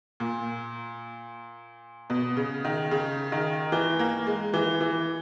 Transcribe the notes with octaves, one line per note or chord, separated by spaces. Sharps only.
A#2
B2
C#3
D#3
C#3
D#3
E3
A#3
G#3
E3
E3